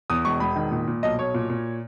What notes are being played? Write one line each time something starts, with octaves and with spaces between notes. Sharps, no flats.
E2 D#6
E1 C#6
E1 B5
D#3
A#2
A#2
B1 D#5
B1 C#5
A#2
A#2